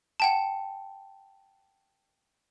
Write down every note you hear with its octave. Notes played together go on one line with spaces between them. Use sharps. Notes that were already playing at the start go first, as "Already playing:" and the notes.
F#5 G5 A5